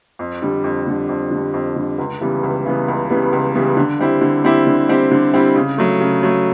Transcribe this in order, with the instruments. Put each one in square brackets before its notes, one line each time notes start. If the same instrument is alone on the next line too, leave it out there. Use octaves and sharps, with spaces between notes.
[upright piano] F2
D3 G3
F2
D3 G3
F2
D3 G3
F2
D3 G3
C#2
C#3 E3 G3 B3
C#2
C#3 E3 G3 B3
C#2
C#3 E3 G3 B3
C#2
C#3 E3 G3 B3
D3
G3 C4 E4 G4
D3
G3 C4 E4 G4
D3
G3 C4 E4 G4
D3
G3 C4 E4 G4
C#3
F#3 A3
C#3
F#3 A3